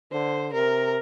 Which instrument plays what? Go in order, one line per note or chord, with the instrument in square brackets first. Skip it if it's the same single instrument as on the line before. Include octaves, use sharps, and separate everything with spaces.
[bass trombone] D3 [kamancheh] C5
[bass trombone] C3 [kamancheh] A#4